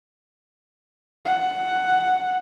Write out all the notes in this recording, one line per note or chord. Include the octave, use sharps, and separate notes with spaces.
F#5